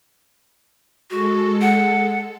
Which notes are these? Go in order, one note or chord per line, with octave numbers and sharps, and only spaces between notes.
G#3 F#4 A4
F#5